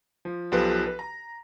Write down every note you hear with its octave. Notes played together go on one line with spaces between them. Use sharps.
F3
B1 F3 G4 A4 B4
B4
A#5